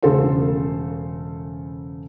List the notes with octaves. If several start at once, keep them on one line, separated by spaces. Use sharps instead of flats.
E1 C#3 A3 A4 C5 C6